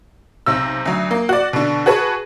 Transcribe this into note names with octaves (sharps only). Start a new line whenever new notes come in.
B1 C3 E6
D2 F#3
A#3
F#4 D5
B2 D3
F#4 G#4 B4 A5 C#6